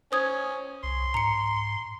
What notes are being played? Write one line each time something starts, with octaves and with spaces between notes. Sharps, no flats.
C#4 C5 D#6 G#6
C2 C6
G#2 A#5 C#7